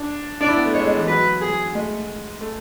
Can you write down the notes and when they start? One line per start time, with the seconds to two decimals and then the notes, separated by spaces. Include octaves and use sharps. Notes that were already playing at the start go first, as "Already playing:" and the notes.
Already playing: D4
0.41 D4 D5
0.48 E4
0.57 B3
0.66 A3
0.74 G#3 C#5
0.86 G#3
0.97 E3
1.07 F#3 B4
1.41 G#4
1.74 G#3 A3
2.41 A3